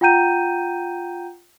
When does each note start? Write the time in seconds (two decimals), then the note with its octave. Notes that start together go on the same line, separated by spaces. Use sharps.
0.01 F4 F#5 G5 A#5 G6 D#7